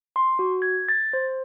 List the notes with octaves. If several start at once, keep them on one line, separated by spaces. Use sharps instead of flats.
C6
F#4
G#6
A6
C5